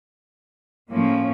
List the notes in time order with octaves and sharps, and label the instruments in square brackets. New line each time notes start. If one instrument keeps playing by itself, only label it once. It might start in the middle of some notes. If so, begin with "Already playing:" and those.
[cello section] A2 F3 A#3 C#4